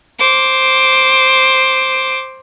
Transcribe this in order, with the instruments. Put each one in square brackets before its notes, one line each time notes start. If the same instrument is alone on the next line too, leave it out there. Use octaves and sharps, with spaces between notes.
[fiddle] C5 D6